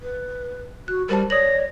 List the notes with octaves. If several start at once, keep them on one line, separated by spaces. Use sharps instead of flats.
B4
F#4 F#6
G3 G4 A#4 C5 A5
C#5 D5 D#6 A#6 F#7